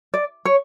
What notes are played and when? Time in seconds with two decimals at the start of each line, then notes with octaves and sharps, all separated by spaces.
0.14 D5
0.45 C#5